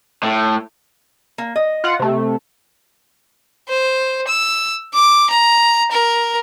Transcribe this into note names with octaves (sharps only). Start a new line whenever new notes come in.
A2
A#3
D#5
F4 F#5
C3 A3
C5
E6
D6
A#5
A#4